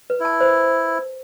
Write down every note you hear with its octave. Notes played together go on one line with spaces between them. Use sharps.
B4
E4 A5
C5